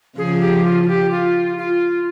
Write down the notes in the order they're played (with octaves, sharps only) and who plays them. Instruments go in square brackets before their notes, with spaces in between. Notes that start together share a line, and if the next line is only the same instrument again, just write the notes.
[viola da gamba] C#3 F3 [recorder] G#4
[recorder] G4
F4
F4
G4
F4
F4